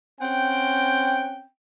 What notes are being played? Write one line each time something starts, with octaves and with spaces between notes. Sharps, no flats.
C4 C#4 F#5 G5